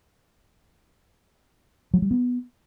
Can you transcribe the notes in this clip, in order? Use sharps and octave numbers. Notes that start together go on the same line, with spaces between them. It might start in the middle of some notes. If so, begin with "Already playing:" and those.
F#3
G3
B3